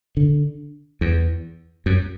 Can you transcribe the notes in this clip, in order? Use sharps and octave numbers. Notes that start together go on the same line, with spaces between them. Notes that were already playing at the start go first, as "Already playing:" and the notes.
D3
E2
F#2